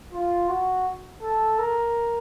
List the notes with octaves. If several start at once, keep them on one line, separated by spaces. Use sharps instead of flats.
F4
F#4
A4
A#4